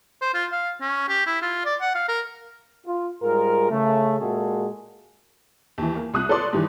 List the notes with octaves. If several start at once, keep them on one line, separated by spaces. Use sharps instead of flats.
C5
F4
F5
C#4
G4
E4
F4
D5
F#5
F5
A#4
F4
G#2 G3 F4 G#4 A#4
C#3 A3
A#2 G#3 A#3 F#4 G#4 A4
D#2 E3
A#3
C2 D#6 F#6
A4 B4 C#5 D5 C6 D6
G2 D#3 E3